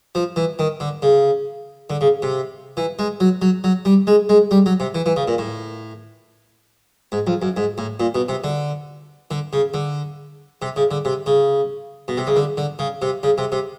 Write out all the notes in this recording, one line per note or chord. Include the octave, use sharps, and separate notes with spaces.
F3
E3
D#3
D3
C#3
D3
C#3
C3
E3
G#3
F#3
F#3
F#3
G3
G#3
G#3
G3
F#3
C3
E3
E3
C#3
A#2
A2
G#2
F2
F#2
G#2
A2
A#2
B2
C3
D3
D3
C#3
D3
C3
C#3
D3
C3
C#3
B2
C3
C#3
D3
D3
C#3
C3
C#3
C3
C3